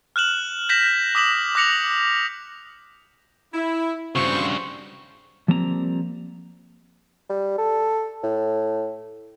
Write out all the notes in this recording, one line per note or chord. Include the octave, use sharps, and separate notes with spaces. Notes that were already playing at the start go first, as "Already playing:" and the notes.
F6 F#6 E7 F#7
G6 A#6 B6 E7 F#7
D6 D#6 B6 E7 F#7
D6 F#6 A#6 C#7 F7
E4
G2 C#3 C4 F#4 C5 C#6
F3 G3 A#3 C4 E4 A#5
G3
A4
A2